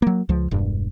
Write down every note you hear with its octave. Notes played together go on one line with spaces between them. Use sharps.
F#3 A#3
C#2 F3
E1 G2